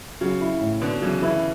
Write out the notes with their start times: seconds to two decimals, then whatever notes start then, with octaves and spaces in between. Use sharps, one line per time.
0.21 C#3 F#3
0.41 E4
0.61 A2
0.81 B2 D3 B3
1.01 C#3 E3 F#3
1.22 C#3 E3 E4